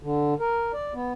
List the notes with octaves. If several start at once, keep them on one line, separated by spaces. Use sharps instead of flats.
D3
A#4
D5
B3